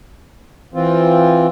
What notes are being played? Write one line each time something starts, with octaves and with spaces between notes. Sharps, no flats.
E3 C4 F4